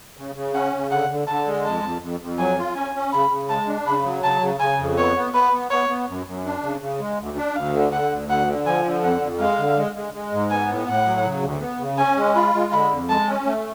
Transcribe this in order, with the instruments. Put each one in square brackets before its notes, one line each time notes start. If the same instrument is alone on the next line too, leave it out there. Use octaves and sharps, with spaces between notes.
[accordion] C#3
C#3
[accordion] C#4 [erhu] F#5
[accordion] C#3
[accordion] D3 [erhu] F#5
[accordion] D3
[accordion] D3 [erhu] A5
[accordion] G#3
[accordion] F2 [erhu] A5
[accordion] F2
F2
F2
[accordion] F#3 [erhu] G#5
[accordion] F4
[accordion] C#4 [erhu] G#5
[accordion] C#4
[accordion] C#3 [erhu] B5
[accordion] C#3
[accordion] G#3 [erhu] A5
[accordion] D4
[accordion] C#3 [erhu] B5
[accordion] F#3
[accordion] C#3 [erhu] A5
[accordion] C#3
[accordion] C#3 [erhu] G#5
[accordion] F2
[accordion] B3 [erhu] C#5
[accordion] B3
[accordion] B3 [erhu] B4
[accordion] B3
[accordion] B3 [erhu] C#5
[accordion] B3
F#2
F#2
D4
C#3
C#3
G#3
D2
D4
[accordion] D2 [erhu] F5
[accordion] D3
[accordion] D3 [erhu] F#5
[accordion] D2
[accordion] D3 [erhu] F#5
[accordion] D3
[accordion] F3 [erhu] G#5
[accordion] D3
[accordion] F2 [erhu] F#5
[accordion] F2
[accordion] G#3 [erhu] F5
[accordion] D3
G#3
G#3
G#3
G#2
[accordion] B3 [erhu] G#5
[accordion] A2
[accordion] A2 [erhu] F#5
[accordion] F#3
C#3
D2
B3
C#3
[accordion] C#4 [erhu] G#5
[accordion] G#3
[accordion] F4 [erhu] B5
[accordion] G#3
[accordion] D3 [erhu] B5
[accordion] F2
[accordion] G#3 [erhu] A5
[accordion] C#4
A3